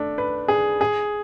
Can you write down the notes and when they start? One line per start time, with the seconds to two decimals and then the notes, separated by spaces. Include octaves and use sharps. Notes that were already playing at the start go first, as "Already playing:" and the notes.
Already playing: A3 D4
0.18 B4
0.48 G#4
0.81 G#4